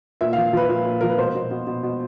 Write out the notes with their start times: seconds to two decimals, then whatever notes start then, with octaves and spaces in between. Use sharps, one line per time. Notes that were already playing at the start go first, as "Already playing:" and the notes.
0.21 A#2 E5
0.33 F3 F5
0.53 F3 B4
0.69 A#2
0.85 A#2
1.01 F3 A#4
1.09 B4
1.18 B2 C5
1.35 B2
1.51 B2
1.67 B2
1.83 B2